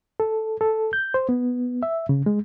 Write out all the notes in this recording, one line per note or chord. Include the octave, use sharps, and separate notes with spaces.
A4
A4
G6
C5
B3
E5
C#3
G#3